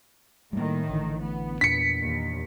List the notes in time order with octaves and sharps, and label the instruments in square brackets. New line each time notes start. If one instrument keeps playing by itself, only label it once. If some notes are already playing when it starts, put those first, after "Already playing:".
[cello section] A2 D#3 [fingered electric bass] G3 A#3
[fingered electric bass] A1 D3 E3
[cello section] B3
[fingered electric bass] E2 A#2 D4 [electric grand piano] B6 C#7
[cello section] D#2